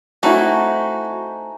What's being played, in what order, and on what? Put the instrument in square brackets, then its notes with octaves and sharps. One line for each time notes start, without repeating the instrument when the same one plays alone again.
[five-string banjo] A3 C4 E4 [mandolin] D#4 [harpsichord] F#4 [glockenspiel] G#5 A5